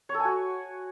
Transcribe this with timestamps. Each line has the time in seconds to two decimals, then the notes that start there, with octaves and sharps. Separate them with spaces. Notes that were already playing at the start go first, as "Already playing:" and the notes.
0.09 C#5
0.14 A4
0.20 G#5
0.25 F#4